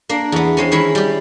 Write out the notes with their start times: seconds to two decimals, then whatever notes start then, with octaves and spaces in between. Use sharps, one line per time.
0.09 A#3 D4
0.32 E2 B3
0.57 G#3 C4 C#4
0.72 D#3 G#3 E4 C#5 B5
0.95 G3 G4